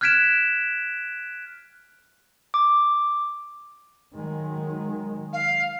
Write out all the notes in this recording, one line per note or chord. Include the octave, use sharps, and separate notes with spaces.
F6 F#6 G#6 B6 D7 E7
D6
D#3 F#3 G#3
F5